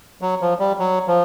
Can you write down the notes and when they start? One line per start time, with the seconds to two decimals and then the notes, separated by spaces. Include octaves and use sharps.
0.22 F#3
0.41 F3
0.59 G3
0.79 F#3
1.07 F3